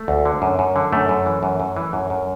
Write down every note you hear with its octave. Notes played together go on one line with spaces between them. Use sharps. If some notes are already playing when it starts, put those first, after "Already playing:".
Already playing: A3
D2
D3
F#2
F#2
D3
F#2 A3
F#2
E3
F#2
F#2
E3
F#2
F#2